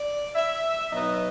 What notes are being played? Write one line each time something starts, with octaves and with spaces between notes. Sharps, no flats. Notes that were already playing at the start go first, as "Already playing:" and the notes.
Already playing: D5
E5
B2 F#3 B3 D#4 D#5